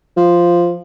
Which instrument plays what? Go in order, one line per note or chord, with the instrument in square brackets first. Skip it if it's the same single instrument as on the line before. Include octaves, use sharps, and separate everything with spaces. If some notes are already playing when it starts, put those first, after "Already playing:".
[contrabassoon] F3